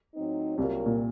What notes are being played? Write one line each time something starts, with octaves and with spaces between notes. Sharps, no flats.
A2 F#3 C4 D#4
C2 C3 F#3 A#3 F4 A#4
A#2